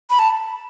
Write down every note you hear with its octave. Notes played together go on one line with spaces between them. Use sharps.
B5
A5